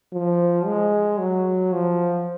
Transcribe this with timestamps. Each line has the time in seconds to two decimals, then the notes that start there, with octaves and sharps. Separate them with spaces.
0.13 F3
0.66 G#3
1.19 F#3
1.72 F3